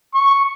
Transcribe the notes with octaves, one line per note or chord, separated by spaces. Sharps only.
C#6